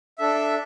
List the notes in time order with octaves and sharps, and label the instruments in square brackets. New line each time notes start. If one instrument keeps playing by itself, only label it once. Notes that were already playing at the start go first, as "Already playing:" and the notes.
[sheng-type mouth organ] D4 A4 E5